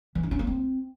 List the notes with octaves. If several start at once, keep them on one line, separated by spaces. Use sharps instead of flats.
E3
E4
C#4
A#3
C4